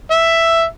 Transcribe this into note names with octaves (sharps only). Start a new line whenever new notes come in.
E5